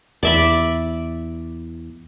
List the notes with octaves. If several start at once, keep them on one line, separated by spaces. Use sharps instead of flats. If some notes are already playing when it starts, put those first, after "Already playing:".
E2 D5 E5 B5